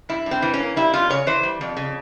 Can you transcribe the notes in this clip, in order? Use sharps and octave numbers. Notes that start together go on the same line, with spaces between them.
G2 E4
G2
C4
E3
C#4
A#3
G3 E4
F2 F4
C#3 C#5
E3 C5
G3
F2
C#3